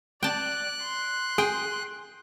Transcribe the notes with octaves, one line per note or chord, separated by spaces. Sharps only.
D5 G5 A5 F#6
C6
G#4 G5